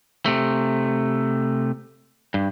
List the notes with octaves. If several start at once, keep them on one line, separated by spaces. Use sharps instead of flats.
C3 A3
G2